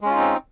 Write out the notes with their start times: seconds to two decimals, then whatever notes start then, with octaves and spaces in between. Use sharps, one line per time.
0.01 G#3
0.05 C#4
0.10 F4
0.15 D#4
0.19 C4